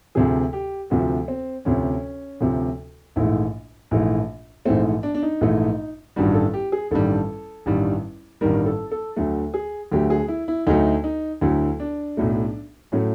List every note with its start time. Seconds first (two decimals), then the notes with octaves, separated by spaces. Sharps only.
0.15 D2 C3 F3 G#4
0.53 G4
0.90 D2 C3 F3 F#4
1.28 C4
1.65 D2 C3 F3 C#4
2.41 D2 C3 F3
3.16 A#1 G#2 E3 A3 E4
3.91 A#1 G#2 E3 A3
4.65 A#1 G#2 E3 A3 C4
5.03 D4
5.15 D4
5.23 D#4
5.41 A#1 G#2 E3 A3
6.16 A1 G2 D#3 G3 F#4
6.34 A4
6.54 G4
6.72 G#4
6.91 A1 G2 D#3 G3 A4
7.66 A1 G2 D#3 G3
8.41 A1 G2 D#3 G3 A#4
8.66 A4
8.91 A4
9.16 D2 D3 F#3 A3
9.54 G#4
9.92 D2 D3 F#3 A3 G4
10.10 G#4
10.28 E4
10.48 E4
10.67 D2 D3 F#3 A3 D#4
11.04 D#4
11.41 D2 D3 F#3 A3 E4
11.80 D4
12.17 B1 A2 F#3 A3
12.92 A2 F#3 A3 C#4